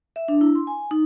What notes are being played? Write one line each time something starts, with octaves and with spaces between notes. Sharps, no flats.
E5
D4
E4
C6
G#5
D#4